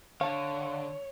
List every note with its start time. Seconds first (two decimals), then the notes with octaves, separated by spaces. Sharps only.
0.21 D3 C#5 F5 A5